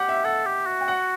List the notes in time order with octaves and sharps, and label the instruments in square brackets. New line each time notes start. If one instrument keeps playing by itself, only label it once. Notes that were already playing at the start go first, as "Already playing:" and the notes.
Already playing: [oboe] G4 [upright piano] F#5
[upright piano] E5
[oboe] A4 [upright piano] F#5
[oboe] G4
F#4
[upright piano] G5
F#5